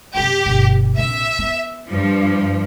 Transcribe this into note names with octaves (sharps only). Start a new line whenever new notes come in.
F#2 C3 G4
G1 B2
A#1 C3 E5
B3
G2 F3